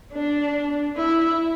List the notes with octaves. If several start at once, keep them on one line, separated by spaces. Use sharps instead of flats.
D4
E4